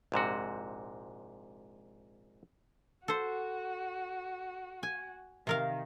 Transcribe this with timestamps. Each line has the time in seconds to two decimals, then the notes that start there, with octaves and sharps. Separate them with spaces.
0.12 A#1 G#2 C3 F#4
3.08 F#4 A4 C5
4.83 G#5
5.47 C3 D#3 A#4 F5